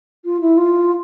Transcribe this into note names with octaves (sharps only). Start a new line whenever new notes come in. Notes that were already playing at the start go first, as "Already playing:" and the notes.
F4
E4
F4